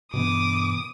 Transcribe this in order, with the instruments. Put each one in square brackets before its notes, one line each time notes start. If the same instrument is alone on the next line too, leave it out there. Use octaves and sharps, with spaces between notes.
[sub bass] G2 [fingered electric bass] B2 E3 B3 [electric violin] D6 [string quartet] D#6